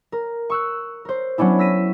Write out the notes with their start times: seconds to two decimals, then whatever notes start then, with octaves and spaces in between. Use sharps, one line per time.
0.12 A#4
0.50 C#6 E6 F#6
1.05 A#4 C5
1.38 F#3 B3 C#4 D4 E4
1.59 E6 A#6 B6 D#7 E7